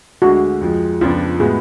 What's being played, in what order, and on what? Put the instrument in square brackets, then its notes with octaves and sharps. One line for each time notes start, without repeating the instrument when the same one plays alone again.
[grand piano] D2 D3 G#3 [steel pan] F#4
[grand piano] F2 F3 G#3
[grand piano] F2 C#3 F3 B3 D4 [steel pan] F4
[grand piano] A2 G#3 B3 F#4 [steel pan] G#4